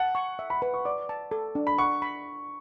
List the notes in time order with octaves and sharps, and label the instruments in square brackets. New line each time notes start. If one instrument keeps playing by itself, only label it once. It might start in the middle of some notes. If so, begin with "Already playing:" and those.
Already playing: [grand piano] F#5 [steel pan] A5
[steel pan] C#6
E5
[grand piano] B5
[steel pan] B4 [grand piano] B5
[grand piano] C#6
[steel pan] D5 [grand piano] D6
[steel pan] A5
A4
D4
[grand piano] B5
[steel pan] F#5 [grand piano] C#6
[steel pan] B5